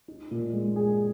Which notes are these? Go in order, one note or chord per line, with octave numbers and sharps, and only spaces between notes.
D#4
A#2
G#3
G#4